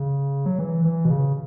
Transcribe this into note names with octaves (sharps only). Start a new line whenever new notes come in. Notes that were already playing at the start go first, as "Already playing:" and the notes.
Already playing: C#3
F#3
E3
E3
B2
C#3